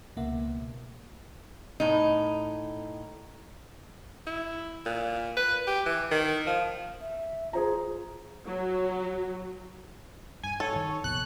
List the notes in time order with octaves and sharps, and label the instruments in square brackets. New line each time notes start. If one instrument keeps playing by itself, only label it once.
[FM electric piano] C#2 B2 A#3 E5 F#5
[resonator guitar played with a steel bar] A2 D#4
[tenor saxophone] E4
A#2
B4
G4
E3
D#3
F3
[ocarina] E5
[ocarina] F4 [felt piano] G#4 C5 A#5
[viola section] F#3
[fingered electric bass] G2 [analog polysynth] G#5
[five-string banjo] A4 [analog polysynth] C#5
[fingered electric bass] D#3
[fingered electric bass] F1 A#1 B2 [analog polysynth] F#6